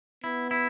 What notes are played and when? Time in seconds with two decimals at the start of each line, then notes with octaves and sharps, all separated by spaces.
0.24 B3 E4
0.51 E4